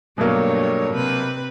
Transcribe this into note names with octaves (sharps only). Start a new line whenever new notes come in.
G2 B2 F#3 A3 A#3 C#5
C3 C4 B4